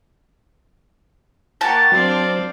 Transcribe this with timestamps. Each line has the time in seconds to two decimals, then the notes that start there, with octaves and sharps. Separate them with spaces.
1.61 A#3 G4 F#5 G5 A5 C#6
1.92 F#3 C4 D4 C5 D5 F5